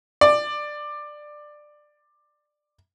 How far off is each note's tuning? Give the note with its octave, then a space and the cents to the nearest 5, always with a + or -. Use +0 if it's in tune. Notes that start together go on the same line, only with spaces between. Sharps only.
D5 +15